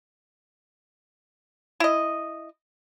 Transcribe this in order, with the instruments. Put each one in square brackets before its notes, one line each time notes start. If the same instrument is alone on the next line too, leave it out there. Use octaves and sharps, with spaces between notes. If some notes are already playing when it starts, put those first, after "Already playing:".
[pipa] E4 D#5